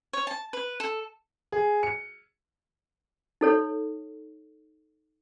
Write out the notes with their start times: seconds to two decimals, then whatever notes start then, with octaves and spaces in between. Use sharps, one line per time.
0.13 C#5
0.27 A5
0.53 B4
0.80 A4
1.52 G#4
1.83 C#7
3.41 D#4 A4 C#5